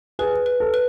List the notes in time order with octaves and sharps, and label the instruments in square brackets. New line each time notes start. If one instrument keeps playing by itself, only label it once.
[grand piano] G#4 [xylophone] B4
[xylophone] B4
[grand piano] A4
[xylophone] B4